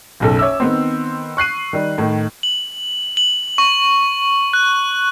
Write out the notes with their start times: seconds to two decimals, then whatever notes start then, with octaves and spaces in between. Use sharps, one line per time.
0.20 F#1 B1 A4
0.39 C#5 E5 D6 E6
0.60 D#3 B3 C4
1.37 C#6 F#6 C7 D#7
1.73 D#3 G3
1.98 A2 D#3
2.43 F#7
3.17 F#7
3.58 C#6
4.53 F#6